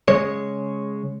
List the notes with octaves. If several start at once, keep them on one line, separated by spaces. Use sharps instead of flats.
C#3 G#3 C#5